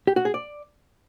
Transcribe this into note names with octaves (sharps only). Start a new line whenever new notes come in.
G4
F#4
G#4
D5